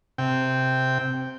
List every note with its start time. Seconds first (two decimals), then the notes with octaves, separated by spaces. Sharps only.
0.18 C3 G5